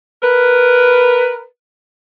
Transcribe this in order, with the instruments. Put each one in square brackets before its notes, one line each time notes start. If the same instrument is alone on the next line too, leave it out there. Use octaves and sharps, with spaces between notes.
[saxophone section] A#4 B4